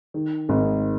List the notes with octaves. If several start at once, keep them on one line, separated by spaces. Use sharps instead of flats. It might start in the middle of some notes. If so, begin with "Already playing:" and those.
D#3
G#1